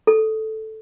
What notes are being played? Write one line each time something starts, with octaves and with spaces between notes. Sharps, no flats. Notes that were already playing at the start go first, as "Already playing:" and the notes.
A4